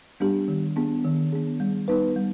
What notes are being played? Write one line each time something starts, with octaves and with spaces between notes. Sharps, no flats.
G3 B3 D4 G4
D#3
B3 D4 G#4
D#3
B3 D4 G#4
G3
B3 D#4 B4
G3